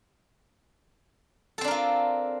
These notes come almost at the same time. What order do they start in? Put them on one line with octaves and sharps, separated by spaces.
A4 C4 D4 A#4 F4